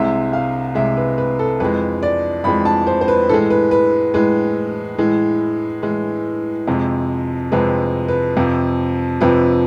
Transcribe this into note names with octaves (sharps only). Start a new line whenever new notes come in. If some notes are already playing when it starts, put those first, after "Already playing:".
Already playing: C2 C3 G#3 E5
F5
C2 C3 G#3 E5
B4
B4
A4
F2 E3 G#3 B4
D5
F2 E3 G#3 B5
A5
C5
C5
B4
A2 E3 G#3 A4
B4
B4
A2 E3 G#3 B4
A2 E3 G#3
A2 E3 G#3
F2 C3 G#3
F2 C3 G#3 B4
B4
F2 C3 F3
F2 C3 F3 B4